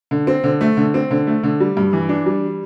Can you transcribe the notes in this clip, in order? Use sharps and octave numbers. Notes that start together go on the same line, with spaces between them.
D3
C4
D3
A3
D3
C4
D3
A3
D3
G3
G2
E3
D4
G3